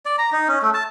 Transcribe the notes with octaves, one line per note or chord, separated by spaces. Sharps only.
D5
A#5
D#4
C#4
A3
A5